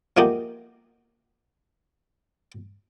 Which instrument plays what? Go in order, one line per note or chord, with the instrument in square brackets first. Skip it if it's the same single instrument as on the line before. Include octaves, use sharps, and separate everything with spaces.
[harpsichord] F3 A3 A#3 D#4 F#4 G4